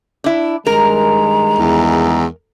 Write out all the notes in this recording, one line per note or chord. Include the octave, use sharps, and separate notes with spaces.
D4 E4
G2 D#3 G#3 A#4 A#5
E2